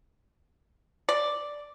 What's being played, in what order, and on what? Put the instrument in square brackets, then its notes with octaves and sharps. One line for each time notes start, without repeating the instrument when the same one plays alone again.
[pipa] D5